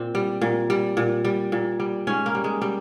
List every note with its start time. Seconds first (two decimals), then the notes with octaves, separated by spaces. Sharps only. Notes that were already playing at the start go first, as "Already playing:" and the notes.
Already playing: A#2 C4
0.15 G3
0.41 A#2
0.70 G3
0.97 A#2
1.25 G3
1.52 A#2
1.80 G3
2.07 G#2 C#4
2.26 A#3
2.35 G3
2.44 G#3
2.62 G3